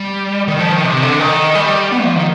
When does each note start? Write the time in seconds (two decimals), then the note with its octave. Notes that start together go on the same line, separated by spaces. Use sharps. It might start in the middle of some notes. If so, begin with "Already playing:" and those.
Already playing: G3
0.48 D#3
0.60 F3
0.72 D#3
0.84 C3
1.02 D3
1.20 D#3
1.55 G3
1.92 B3
2.04 F3
2.16 D#3